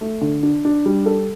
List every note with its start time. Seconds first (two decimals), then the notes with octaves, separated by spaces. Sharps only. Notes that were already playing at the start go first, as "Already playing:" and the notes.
0.01 A3
0.21 D3
0.43 D4
0.65 D4
0.86 G3
1.06 A4